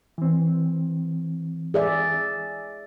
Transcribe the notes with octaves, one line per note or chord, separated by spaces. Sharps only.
E3 C4
G#4 D5 E5